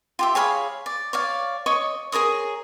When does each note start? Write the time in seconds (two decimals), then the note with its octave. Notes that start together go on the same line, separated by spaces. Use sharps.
0.19 F4 G4 E5
0.35 G#4 C#5 F5 B5
0.86 D5
1.13 C#5 D5 F5
1.66 C#5 D#5 C#6
2.12 G#4 A#4 C#5 D#6